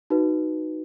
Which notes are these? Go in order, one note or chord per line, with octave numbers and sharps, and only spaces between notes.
D#4 F#4 B4